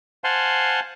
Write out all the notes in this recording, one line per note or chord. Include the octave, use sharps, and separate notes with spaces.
C5 F5 F#5 G#5 A5 C6